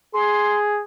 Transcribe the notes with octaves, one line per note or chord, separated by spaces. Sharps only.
G#4 C6